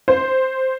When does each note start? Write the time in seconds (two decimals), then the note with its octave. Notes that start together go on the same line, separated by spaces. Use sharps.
0.08 C5